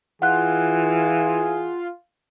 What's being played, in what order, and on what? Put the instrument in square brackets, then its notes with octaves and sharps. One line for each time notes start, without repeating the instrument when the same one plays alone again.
[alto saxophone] E3 [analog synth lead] F4 [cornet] G#4 [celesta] F#5 F#6